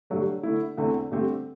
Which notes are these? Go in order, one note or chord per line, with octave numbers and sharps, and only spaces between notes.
G2 D3 F#3 A3
D3 A3 E4
E2 D3 A3 C4
G2 D3 A3 C4 G4